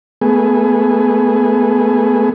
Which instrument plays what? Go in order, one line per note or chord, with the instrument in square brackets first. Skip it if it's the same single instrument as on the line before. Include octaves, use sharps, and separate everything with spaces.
[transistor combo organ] A3 B3 G#4